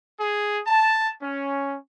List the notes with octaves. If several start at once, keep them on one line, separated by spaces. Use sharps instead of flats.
G#4
A5
C#4